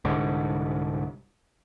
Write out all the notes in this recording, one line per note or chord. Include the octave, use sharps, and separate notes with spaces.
C2 G#2 D3